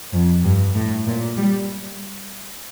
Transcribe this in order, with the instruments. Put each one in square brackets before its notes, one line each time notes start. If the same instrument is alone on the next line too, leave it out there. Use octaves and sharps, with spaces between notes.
[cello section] F2
G2
A2
A#2
G3